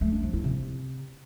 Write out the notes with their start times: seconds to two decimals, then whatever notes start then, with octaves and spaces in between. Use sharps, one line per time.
0.01 A3
0.12 D4
0.23 F3
0.33 E4
0.44 C3